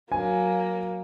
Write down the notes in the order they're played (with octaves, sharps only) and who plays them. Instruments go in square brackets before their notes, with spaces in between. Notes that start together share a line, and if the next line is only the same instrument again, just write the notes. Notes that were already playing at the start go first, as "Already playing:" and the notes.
[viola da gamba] F#3 [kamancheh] A#3 [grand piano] G#5